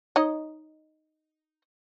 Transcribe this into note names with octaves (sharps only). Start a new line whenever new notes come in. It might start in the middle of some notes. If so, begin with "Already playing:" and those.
D#4 C#5 D#5